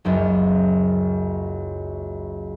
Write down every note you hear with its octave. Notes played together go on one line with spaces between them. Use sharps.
F#1 C#2 F#2